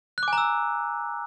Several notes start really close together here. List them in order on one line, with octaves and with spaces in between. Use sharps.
F#6 D6 G#5 A#5 E6